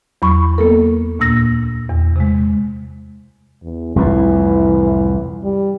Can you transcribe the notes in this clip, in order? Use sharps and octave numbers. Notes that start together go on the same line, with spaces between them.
E2 F#3 B5 C#6
A#3 B3 A4 A#4
D2 A#2 A#3 E6 A#6
E2
C3 G#3
E2
C2 F2 A2 E3
G3